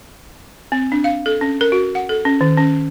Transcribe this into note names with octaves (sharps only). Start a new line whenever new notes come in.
C4
D4
F5
A4
C#4
A#4
F#4
F#5
A4
C#4
D#3
C#4